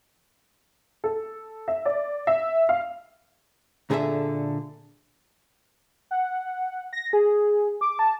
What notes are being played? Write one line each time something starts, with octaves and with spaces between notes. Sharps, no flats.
A4
E5
D5
E5
F5
A#2 D3 G#4 A4 C#5 E5
F#5
A#6
G#4
D6
A5